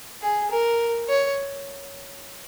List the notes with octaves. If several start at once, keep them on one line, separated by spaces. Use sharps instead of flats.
G#4
A#4
C#5